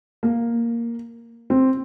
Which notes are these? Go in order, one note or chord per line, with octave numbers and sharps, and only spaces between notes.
A#3
C4